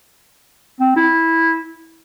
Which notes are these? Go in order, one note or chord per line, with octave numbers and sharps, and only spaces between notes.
C4
E4